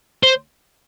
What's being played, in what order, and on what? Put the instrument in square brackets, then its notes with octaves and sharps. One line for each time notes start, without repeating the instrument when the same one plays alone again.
[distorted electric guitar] C5